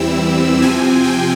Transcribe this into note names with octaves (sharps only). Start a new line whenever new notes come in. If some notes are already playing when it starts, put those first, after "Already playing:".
Already playing: E2 E3 G3 C4 E4 E6
C3 F3 C4 G#5
G5